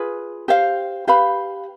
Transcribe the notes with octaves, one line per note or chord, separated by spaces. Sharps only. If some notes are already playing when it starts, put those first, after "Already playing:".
Already playing: F4 G#4 B4
G4 C5 F5
G4 B4 F5 B5